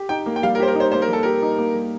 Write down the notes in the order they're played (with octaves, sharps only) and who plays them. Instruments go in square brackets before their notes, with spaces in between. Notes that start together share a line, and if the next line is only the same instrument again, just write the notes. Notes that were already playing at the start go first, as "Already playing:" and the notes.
Already playing: [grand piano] G4
[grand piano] D#4 [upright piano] G5
[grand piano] A#3
[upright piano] G5
[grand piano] G3 [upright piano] F5
[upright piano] A#4
[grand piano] G4 [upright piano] C5
[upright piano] A#4
[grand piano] D#4
[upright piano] C5
[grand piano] A#3 [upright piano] C5
[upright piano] A#4
[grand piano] G3 [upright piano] A4
[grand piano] G4 [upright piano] A#4
[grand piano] D#4
A#3
G3